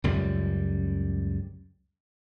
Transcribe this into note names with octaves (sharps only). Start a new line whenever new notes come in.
C#2 F#2 G3